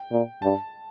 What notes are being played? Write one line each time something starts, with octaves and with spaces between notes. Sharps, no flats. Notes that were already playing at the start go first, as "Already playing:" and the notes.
Already playing: G5
A#2
G2 A5